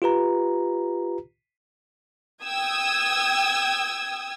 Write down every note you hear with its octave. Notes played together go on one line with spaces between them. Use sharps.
F4 G4 B4 A#5
G5 D#6 E6 G#6